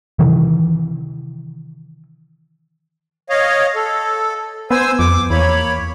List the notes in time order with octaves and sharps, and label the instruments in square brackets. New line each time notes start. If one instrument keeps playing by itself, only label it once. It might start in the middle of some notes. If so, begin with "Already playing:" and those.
[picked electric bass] C3 D#3 E3
[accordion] C#5 D#5 F5
A4
[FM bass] B3 [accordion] C5 G#5 E6
[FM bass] F2 [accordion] D6
[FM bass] E2 [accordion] A#3 C#5 B5